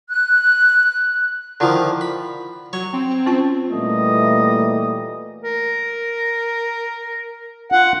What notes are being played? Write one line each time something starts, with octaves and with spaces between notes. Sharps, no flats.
F#6
D3 D#3 F3 E4 F4 D5
B5
F#3 C#5
C4
C#4 F4 A5
A#2 E3 G3 A3 A#3 D#5
A#4
F4 F#5